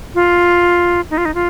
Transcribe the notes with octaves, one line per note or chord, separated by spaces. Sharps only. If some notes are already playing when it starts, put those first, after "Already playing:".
F4
D#4
F4
D#4
F4